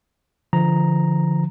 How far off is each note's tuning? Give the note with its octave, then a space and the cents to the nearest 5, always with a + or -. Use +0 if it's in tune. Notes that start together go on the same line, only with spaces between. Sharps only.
D3 +0 F3 -25 A#5 +0